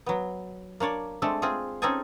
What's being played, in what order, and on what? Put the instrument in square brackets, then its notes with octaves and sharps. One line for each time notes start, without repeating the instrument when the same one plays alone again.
[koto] F#3 B3
A#3 D4 C#5 D5
G#3 A3 C4 D4 A4
C4 F4 G#4
C4 C#4 D#4 G#4 A4 G#5